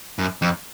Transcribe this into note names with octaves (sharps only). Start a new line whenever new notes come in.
F#2
F2